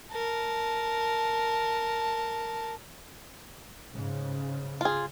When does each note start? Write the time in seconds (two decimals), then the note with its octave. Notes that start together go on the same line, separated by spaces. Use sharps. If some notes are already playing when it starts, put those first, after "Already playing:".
0.11 A#4 A5
3.92 G#2 C#3
4.81 F4 G#4